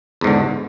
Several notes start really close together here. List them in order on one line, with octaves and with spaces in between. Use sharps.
E2 G#2 D3